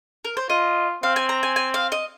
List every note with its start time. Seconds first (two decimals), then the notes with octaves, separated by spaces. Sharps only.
0.25 A#4
0.37 C5
0.49 F4 D#5
1.03 C4 F5
1.16 G#5
1.29 A#5
1.43 G#5
1.56 G#5
1.74 F5
1.92 D#5